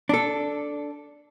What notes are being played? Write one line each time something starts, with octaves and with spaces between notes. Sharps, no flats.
D4 A4